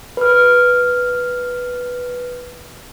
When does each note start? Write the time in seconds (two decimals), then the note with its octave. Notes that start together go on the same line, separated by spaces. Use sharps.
0.17 B4 F6